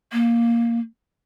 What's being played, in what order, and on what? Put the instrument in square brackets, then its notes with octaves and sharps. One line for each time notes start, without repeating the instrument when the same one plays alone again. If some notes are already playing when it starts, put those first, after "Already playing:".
[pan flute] A#3